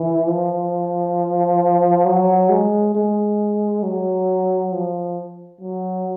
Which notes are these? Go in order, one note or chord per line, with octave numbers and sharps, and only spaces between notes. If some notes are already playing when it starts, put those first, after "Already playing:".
Already playing: E3
F3
F#3
G#3
G#3
F#3
F3
F#3